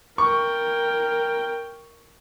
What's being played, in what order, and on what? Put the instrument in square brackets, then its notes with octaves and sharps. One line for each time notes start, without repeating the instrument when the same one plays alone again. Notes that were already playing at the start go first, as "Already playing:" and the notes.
[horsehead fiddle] A#4 G5 [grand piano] C#6